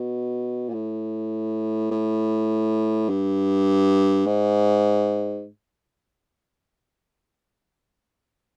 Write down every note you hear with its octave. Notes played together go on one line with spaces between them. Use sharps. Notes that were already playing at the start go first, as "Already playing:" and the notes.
Already playing: B2
A#2
A2
A2
G2
G#2